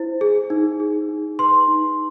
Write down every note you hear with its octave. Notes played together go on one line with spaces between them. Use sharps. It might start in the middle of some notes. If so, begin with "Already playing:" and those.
Already playing: E4 C5
G#4
D#4
G#4
D#4
B4 C6
D#4